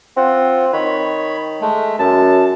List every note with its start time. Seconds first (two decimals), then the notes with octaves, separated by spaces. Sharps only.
0.17 C4 F4 F#5
0.73 D#3 C#5 B5
1.61 G#3 A3
1.99 F#2 A5